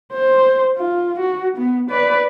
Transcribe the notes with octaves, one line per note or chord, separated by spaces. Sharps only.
C5
F4
F#4
B3
B4 D5